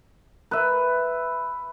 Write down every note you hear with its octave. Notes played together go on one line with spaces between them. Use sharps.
B4 E5